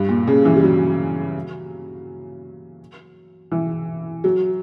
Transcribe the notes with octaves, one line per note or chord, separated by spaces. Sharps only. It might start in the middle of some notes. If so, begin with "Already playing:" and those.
Already playing: G2
A#2
C#3
E3
G3
F#3
E3
F#3